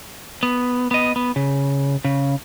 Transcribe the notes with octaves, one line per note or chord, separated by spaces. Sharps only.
B3
B3 D#5
B3
C#3
C#3